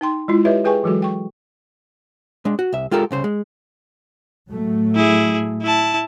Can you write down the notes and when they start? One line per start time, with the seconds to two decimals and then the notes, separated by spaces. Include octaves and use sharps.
0.01 D#4 G5 C6
0.28 G#3 E4 F4
0.45 G4 B4 C#5 D#5 E5
0.64 G#4 B4 G5 G#5 C#6
0.83 E3 F#3 G#3 F#4 A4
1.02 G5 C#6
2.45 G#3 D4
2.59 F#4
2.73 C2 E5
2.91 G#3 F4 G4 A4 A#4
3.11 C2 C#3 C5
3.24 G#3
4.49 A2 F#3 A3
4.96 E4 G#4
5.62 E4 A5